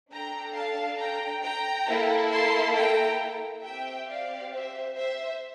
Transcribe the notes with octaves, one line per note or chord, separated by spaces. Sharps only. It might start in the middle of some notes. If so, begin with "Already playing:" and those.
D4 A4 G5 A#5
F5 A5
G5 A#5
G5 A#5
A#3 E4 A4
A5 C6
G5 A#5
C4 G4 E5 G5
D5 F5
C5 E5
C5 E5